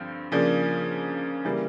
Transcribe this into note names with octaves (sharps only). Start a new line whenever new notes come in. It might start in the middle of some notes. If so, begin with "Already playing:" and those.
Already playing: G2 D3 F3 C4
C#3 F3 A#3 D4
C#3 E3 G3 A#3